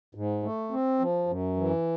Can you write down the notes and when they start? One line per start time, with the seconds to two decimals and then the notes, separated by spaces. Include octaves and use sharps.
0.15 G#2
0.43 A3
0.71 C4
0.99 F3
1.27 F#2
1.56 E3